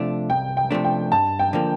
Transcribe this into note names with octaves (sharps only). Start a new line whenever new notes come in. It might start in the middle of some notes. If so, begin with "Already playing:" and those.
Already playing: C3 F3 A3 D4
C2 G5
G5
C3 F3 A3 D4
G5
G2 A5
G5
D3 F3 A#3